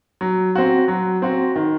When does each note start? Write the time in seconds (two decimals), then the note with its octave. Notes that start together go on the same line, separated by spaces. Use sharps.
0.21 F#3
0.55 C4 F#4
0.88 F#3
1.22 C4 F#4
1.56 D#3